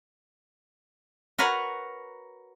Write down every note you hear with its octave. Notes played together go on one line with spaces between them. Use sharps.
F#4 A#4 B4 C#5 F#5